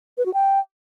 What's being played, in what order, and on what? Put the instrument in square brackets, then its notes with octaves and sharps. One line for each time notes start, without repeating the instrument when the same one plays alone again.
[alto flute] B4
F#4
G5